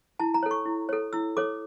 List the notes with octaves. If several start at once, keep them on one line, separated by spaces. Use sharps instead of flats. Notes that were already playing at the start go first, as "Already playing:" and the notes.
E4 A5
A#5
A4 C#5
C#6
E4
A4 C#5
E4 E6
A4 C#5 D6